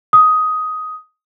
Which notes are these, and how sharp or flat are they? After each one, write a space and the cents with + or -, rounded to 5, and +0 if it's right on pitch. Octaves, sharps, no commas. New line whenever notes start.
D#6 +10